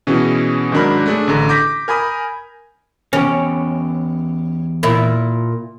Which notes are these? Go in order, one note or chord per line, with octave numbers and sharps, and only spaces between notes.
B2 E3 C#4 G#4
G#2 D#3 F#3 D4 A#4 B5
A3 D4 G#4
A1 D3 A#5
D6 G6 A#6 B6
A#4 G#5 B5 D#6
E2 C#4 G4
A#2 E4